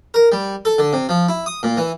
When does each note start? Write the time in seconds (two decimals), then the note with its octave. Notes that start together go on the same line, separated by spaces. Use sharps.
0.14 A#4
0.32 G3
0.65 A4
0.78 D3
0.93 C3
1.09 F3
1.28 E4
1.46 D#6
1.63 A#2
1.77 E3